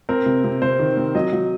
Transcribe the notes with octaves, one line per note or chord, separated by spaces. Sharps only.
C4 A#4
C3
C3
C3 C5
D#3
C4
F#3 D#5
F#3